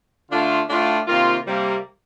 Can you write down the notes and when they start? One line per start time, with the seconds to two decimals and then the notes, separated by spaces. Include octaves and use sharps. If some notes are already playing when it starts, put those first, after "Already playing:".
0.30 D3 A3 D4 F4
0.69 A2 A3 D4 F4
1.07 C3 D#3 A#3 F4
1.46 C3 G3 A#3